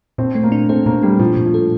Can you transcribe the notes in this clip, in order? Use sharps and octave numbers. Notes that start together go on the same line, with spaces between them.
A#2 C4
A3
A#3
D4
C4 A4
A#2 A#3
G3 A3
A#2 F3
A#2
F3
A4